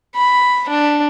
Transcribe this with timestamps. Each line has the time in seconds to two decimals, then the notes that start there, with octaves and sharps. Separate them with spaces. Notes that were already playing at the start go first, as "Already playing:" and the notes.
0.15 B5
0.69 D4